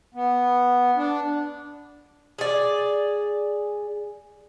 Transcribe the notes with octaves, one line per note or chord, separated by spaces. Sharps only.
B3
D4
G#4 D5